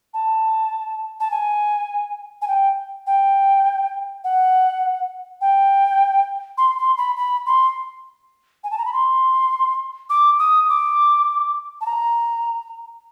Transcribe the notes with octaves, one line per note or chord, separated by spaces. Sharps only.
A5
A5
G#5
G#5
G5
G5
F#5
G5
C6
C6
B5
B5
C6
G#5
A5
A#5
B5
C6
D6
D#6
D6
A5
A#5